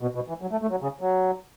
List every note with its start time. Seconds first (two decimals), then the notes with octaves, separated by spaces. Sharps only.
0.02 B2
0.15 B2
0.29 E3
0.42 F#3
0.52 A3
0.62 A3
0.71 F#3
0.82 C#3
1.01 F#3